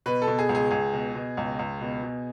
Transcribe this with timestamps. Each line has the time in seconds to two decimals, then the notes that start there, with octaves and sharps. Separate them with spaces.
0.06 B2 B4
0.22 A4
0.27 B2
0.39 G#4
0.49 C#2
0.55 G#4
0.71 C#2 G#4
0.94 B2
1.15 B2
1.37 C#2
1.59 C#2
1.81 B2
2.03 B2